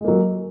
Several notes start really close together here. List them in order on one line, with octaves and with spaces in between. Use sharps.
G#3 A#3 F#3